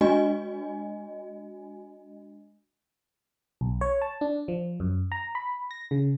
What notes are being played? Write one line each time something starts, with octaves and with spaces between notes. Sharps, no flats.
G#3 D4 F#4 D#5 G#5
B1
C#5
A5
D4
F3
F#2
A#5
B5
A#6
C#3